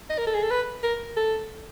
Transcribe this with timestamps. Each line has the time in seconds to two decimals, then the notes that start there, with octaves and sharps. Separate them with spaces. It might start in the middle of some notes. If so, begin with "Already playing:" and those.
0.09 D#5
0.18 A#4
0.27 A4
0.34 G#4
0.43 A4
0.51 B4
0.83 A#4
1.17 A4